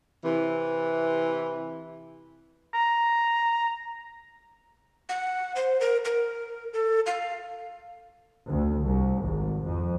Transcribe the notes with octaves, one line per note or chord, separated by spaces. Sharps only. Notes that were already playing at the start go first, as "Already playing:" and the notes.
C3 E3
A#5
F#5
C5
A#4
A#4
A4
F5
D2
C2
G#1
F2